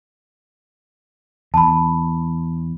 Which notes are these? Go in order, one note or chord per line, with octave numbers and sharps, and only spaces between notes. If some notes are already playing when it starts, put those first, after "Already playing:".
E2 A5 B5